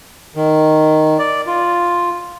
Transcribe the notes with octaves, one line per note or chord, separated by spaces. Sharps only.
D#3
D5
F4